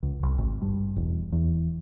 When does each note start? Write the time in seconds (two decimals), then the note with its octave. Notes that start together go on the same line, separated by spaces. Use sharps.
0.03 C#2
0.23 C2
0.38 G#1
0.62 G2
0.96 E1
1.32 E2